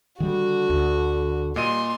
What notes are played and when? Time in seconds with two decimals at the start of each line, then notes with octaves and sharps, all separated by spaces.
0.20 D3 D#3 G3 F#4
0.70 D2
1.56 A#2 G3 D#5 C6 D#7